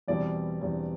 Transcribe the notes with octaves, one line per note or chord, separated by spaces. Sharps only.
E2 B2 G3 C4 D5
E2 B2 G3 C4